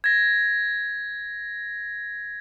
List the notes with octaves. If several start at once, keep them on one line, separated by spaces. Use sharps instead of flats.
G#6 A#6